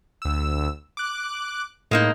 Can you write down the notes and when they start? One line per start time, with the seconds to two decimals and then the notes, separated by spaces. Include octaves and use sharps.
0.22 D2 E6
0.97 D6 F#6
1.91 A2 G#3 A#3 D#4